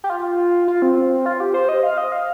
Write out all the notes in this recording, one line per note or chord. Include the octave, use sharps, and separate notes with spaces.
G4
F4
F4
C4
F4
G4
C5
D#5
F5
D#5
F5